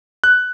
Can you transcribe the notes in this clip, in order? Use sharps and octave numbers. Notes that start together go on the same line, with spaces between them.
F#6